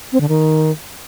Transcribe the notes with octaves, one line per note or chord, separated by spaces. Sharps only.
C4
D3
D#3